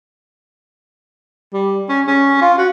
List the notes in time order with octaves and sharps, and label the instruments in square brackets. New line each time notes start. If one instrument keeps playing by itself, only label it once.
[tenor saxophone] G3
C#4
C#4
F4
F#4